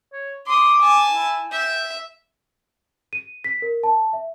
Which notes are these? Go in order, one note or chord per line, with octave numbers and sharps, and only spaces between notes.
C#5
C6 D6 D#6
G#5 A5
E4
E5 G5
D#7
B6
A#4
A5
E5